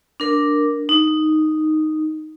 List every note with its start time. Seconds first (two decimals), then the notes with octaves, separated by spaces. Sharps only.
0.20 D4 A#4
0.89 D#4